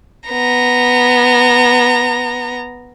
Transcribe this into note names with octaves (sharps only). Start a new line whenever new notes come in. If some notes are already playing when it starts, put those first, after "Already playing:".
B3 A#5